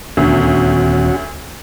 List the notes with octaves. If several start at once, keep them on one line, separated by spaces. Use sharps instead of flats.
D#1 D2 B3 C#4 F#4